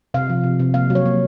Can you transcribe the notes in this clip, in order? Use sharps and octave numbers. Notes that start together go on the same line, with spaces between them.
C3 F5
F3
C3
C3
A#3 F5
F#3
C#5
A#3